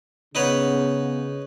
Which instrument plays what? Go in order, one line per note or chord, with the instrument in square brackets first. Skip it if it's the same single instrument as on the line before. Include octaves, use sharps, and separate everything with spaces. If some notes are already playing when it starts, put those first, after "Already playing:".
[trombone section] C#3 [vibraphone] B3 F#5 [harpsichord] D#4 B4 C#5